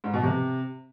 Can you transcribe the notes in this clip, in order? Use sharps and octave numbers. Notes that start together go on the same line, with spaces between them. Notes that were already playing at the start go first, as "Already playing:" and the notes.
G#2
B2
C3